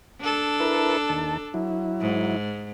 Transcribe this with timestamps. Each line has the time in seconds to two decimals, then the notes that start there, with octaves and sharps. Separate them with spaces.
0.21 D4 A4
0.60 E4 A#4 B4
1.09 D#2 A5
1.54 F#3 E4
2.01 G#2